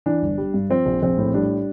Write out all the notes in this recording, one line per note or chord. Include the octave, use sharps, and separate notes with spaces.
E3 D4
G1
G3
G2
F3 C4
A#1
A#1 C4
A2
G3 D4